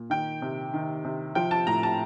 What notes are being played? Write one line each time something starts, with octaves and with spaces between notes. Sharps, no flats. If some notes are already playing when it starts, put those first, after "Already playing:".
Already playing: A#2
D#3 G5
C3
D#3
C3
F3 G5
A5
A2 A#5
A5